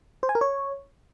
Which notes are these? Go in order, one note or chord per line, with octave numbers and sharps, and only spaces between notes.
C5
G#5
A#4
C#5